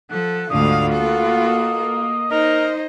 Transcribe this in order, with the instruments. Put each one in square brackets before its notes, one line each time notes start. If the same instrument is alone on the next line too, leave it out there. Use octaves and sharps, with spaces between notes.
[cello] F3 A4 [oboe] F#5
[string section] D2 G#2 [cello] D3 F5 [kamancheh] F4 F#4 [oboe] D#6
[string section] A#3 [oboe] B3 [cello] A4
[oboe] D#5
[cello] D#4 [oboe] A#4 [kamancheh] C5 D#5